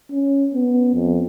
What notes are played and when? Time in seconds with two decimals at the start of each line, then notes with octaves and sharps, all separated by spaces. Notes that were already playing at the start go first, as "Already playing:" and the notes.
0.11 C#4
0.54 B3
0.94 F2